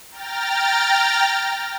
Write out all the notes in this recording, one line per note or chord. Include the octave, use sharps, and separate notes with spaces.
G5 A#5 F6 A6